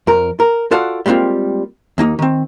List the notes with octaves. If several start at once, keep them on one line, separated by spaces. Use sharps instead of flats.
F2 A#4
A#4
F4 F#4 A4 D5 F5 F#5
G3 G#3 A#3 C4 F4
D#2 A#3 D#4
D#3 C4